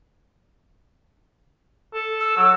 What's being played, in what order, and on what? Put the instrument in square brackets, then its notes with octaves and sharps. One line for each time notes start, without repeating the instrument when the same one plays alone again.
[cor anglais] A4
[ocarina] E6
[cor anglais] F#3